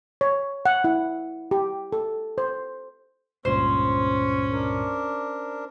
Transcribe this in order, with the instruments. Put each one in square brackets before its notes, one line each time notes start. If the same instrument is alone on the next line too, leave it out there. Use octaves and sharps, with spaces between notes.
[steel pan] C#5
F#5
E4
G4
A4
C5
[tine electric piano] C#2 G2 A#2 [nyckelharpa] C#4 [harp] C5
[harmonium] D4 A#4